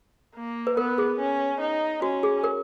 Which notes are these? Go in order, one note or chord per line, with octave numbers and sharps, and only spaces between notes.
A#3
B4
B3 A#4
G#4
C#4
D#4
C#4 F#4
G#4
A#4